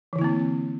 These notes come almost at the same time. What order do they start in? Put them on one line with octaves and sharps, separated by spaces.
E3 D3 E4 A#3 C4